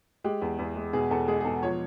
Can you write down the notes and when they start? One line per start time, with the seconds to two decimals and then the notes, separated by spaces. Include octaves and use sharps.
0.24 G#3 G4
0.42 E2
0.59 E2
0.76 G#3
0.93 B2 G#4
1.11 E2 A4
1.28 G#3 G#4
1.41 G#4
1.45 B2 A4
1.62 F3 C#5